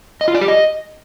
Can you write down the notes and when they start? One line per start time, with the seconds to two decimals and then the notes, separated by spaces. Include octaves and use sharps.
0.21 D#5
0.28 F4
0.35 D5
0.41 G4
0.48 D#5